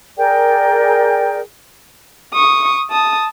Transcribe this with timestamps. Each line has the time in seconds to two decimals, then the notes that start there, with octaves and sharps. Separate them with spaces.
0.17 G#4 A#4 D5 G5
2.34 C#6 D#6
2.90 A5 D#6